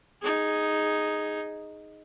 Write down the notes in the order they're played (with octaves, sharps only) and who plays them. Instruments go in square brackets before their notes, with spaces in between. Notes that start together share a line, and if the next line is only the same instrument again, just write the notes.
[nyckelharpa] D#4 G#4